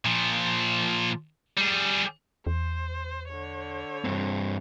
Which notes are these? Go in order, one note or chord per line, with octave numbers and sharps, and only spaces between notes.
A#2 F3
G3 G#4
E2 C5
D3 C#5
G2 C4